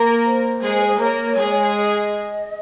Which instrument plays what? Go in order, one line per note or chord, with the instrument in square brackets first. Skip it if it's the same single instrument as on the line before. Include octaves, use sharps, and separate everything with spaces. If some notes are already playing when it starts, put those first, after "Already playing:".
Already playing: [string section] A#3 A#4
[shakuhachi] C5
[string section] G#3 G#4
[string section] A#3 A#4 [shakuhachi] C#5
[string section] G#3 G#4
[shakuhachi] D#5